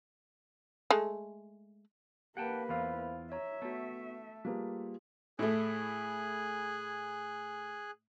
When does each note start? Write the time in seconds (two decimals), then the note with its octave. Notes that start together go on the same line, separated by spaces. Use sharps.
0.90 G#3 A3
2.37 A#3 G4 B4 F#5 G5 A5
2.69 E2 E3 F4 C5 F5 B5
3.32 C#5 E5 A#5
3.62 A3 B3 F#4
4.45 G3 A#3 F4 G#4 B4
5.39 A2 A3 G#4 G#5 F#6